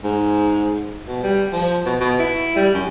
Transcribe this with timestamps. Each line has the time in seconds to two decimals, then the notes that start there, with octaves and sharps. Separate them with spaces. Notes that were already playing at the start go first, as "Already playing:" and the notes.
0.04 G#2
1.08 B2
1.24 G3
1.53 F3
1.86 B2
2.01 B2
2.19 E4
2.56 G3
2.74 F#2